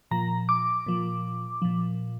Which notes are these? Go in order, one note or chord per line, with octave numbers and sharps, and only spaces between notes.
A#2 F3 A#5
D6
A#2 F3
A#2 F3